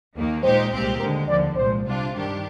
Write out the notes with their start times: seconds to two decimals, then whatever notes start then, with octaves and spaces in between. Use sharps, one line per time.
0.16 D#2 D#3 A#3
0.43 A#2 G#3 D#4 G4 C5
0.72 C2 A#2 G#3 C4 G4
1.00 D#2 D3 G#3 A#4
1.29 D#2 D3 F3 D5
1.56 C2 A#2 G#3 C5
1.85 C3 G3 D4 F4
2.13 G2 D#3 G3 D4 G4